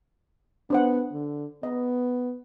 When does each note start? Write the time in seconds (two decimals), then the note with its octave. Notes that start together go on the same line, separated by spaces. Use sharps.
0.70 B3 D4 C5 F#5
1.13 D3
1.63 B3 D#5